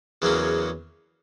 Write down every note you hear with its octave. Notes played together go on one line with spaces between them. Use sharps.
E2 C#3 F#3 A#3 C#4